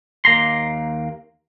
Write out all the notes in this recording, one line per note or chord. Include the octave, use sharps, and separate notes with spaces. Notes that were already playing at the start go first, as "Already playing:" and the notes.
D#2 A#3 A#5 C6